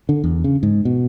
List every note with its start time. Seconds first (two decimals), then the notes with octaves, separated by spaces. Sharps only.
0.09 D3
0.24 E2
0.44 C#3
0.63 G#2
0.85 B2